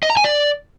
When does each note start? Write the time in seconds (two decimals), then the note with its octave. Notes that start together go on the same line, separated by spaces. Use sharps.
0.03 D#5
0.10 A#5
0.17 G#5
0.24 D5